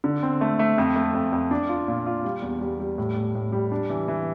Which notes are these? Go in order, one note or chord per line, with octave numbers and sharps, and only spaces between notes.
D3
C4
A3
A3
F2
A3
F2
F2
D4
F4
A#2
F4
G3
E2
G3
G3
A2
A2
A2
G3
D4
E3
E3